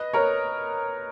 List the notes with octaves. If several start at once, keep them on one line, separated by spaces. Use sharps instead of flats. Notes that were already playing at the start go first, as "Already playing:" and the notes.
Already playing: B4 D#5
A#4 C#5